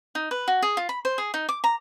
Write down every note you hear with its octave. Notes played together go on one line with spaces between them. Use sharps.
D#4
B4
F#4
G#4
F4
B5
C5
G#4
D#4
D6
A#5